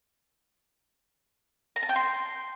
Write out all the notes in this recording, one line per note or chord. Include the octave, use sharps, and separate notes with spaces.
A#5
A5
G5
C6